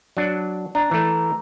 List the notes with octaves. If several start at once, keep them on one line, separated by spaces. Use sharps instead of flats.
F#3 D4
D4 A#5
E3 A3